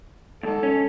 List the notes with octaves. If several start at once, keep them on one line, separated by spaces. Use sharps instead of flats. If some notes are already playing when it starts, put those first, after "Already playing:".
D2 G#2 A4
C#4